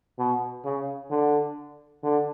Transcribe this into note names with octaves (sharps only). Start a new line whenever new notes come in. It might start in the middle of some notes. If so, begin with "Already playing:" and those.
B2
C#3
D3
D3